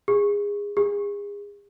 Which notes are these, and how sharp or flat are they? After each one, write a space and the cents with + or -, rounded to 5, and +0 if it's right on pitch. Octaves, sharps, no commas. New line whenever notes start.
G#4 -25
G#4 -35